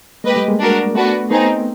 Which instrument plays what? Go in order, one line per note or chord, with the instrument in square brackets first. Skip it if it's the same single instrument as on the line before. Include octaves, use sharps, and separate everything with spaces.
[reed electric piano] G#3 A#3 [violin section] G4 B4 D#5
[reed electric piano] G3 A3
G#3 A#3
[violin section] D4 F#4 A#4
[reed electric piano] A3 B3 [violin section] D4 F#4 B4
[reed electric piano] A3 B3 [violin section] C4 D#4 G#4